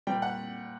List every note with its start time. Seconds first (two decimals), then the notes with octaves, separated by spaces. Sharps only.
0.07 A#2 G3 G5
0.22 F#5